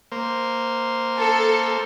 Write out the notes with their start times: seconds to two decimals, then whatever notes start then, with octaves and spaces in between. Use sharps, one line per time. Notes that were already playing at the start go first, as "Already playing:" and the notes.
0.12 A#3 C5
1.18 A4